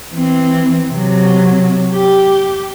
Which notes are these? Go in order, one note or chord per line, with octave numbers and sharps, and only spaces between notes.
E3 C4
C3 F#3
G4